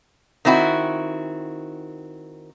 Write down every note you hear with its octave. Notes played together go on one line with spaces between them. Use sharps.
D#3 C4 E4 F#4